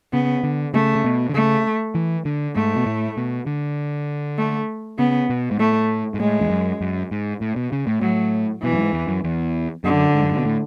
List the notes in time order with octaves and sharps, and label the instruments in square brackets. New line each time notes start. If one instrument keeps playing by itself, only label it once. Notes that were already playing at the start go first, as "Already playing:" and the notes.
[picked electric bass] C#3 [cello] B3
[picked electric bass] D3
[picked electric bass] C#3 [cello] A3
[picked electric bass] C#3
B2
D3
[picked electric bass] C#3 [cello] A3
[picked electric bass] E3
D3
[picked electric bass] G#2 [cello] A3
[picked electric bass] B2
A2
B2
D3
[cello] A3
[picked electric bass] C#3 [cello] B3
[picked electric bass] B2
G#2
[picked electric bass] A2 [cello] A3
[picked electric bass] G#2
[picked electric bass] A2 [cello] G#3
[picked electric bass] E2
F#2
F#2
G#2
A2
B2
C#3
A2
[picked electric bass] A2 [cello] F#3
[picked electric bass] B2 [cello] E3
[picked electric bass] F#2
G#2
E2
F#2
E2
[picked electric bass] F#2 [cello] D3
[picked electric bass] G#2
F#2
G#2
B2
A2